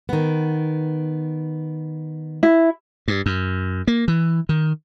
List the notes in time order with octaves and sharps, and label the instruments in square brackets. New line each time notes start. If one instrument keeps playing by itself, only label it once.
[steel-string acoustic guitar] D#3 B3
[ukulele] E4
[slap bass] G2
F#2
A#3
E3
D#3